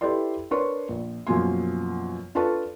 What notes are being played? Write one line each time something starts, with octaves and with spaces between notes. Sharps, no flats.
E4 G4 A4 B4 D5 C6
D4 A#4 B4 C#5 C6 C#6
A#1
F#2 B2 F3 A#3 G#5 C6
D4 F4 A4 B4 A5 C#6